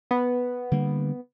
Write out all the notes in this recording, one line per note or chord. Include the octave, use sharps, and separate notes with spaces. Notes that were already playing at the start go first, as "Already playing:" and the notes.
B3
D3 G3 A#3